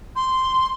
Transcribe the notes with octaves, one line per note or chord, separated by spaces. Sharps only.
C6